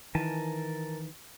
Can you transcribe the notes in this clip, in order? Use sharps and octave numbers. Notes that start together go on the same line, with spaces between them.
D#3 E3 A#4 G#5 A5